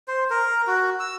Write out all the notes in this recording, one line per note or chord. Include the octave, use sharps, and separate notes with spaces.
C5
A#4
F#4
E6